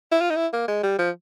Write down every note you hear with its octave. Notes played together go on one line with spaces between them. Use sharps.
E4
F4
D#4
E4
A#3
G#3
G3
F3